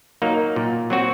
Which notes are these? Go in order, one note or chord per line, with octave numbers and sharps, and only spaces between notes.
F#3 A#3 D#4
A#2
F#3 C4 F#4